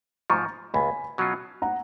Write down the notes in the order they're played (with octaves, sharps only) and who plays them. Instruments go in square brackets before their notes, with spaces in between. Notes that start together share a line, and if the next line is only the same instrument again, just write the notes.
[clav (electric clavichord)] G#2 F3 [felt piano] A#5 C#6
[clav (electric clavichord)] C#2 [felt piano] G#5 B5
[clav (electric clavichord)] B2 F#3 C#4 F4
[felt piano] F#5 A#5